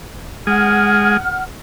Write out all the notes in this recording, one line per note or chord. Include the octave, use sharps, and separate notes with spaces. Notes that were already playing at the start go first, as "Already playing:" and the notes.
G#3 G#4 F#5 F6